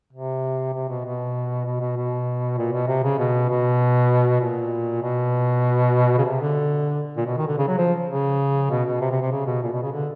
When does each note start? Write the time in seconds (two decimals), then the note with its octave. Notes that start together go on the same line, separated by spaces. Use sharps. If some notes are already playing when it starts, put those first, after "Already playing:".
0.13 C3
0.74 C3
0.89 B2
1.05 B2
1.66 B2
1.80 B2
1.97 B2
2.58 A#2
2.73 B2
2.88 C3
3.04 C#3
3.19 B2
3.49 B2
4.41 A#2
5.02 B2
6.18 C#3
6.25 C3
6.41 D3
7.17 A#2
7.27 B2
7.38 D#3
7.47 D3
7.58 C#3
7.68 F#3
7.78 F3
8.09 C#3
8.70 B2
8.86 B2
9.01 C3
9.11 C3
9.21 C3
9.32 C#3
9.46 B2
9.63 A#2
9.72 B2
9.83 C#3
9.92 D3